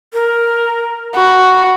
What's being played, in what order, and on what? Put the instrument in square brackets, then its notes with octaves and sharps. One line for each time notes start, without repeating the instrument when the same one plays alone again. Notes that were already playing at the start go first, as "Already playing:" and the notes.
[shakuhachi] A#4
[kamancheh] F#4 [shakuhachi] B5